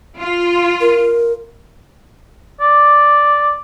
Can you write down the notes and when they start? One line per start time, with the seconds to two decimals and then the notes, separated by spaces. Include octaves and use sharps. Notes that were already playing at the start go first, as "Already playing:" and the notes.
0.19 F4
0.80 A#4
2.60 D5